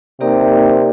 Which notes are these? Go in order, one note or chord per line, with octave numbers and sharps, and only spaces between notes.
C3 A#3 D#4 G4 A#4 D5